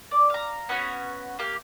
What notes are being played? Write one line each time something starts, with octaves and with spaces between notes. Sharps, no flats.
D5
F5 A#5
B3 C#4 F#4 C#5
A#3 G4 F5